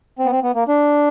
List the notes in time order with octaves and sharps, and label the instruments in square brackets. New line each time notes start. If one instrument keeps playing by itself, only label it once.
[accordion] C4
B3
C4
B3
A#3
D4